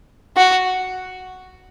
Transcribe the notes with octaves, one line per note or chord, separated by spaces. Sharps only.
F#4